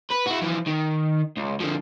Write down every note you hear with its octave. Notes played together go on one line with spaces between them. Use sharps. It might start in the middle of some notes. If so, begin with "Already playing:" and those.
B4
E4 F#4
E3 F3
D#3
C#2
D3 F3